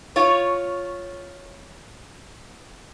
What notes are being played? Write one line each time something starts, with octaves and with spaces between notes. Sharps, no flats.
F4 C#5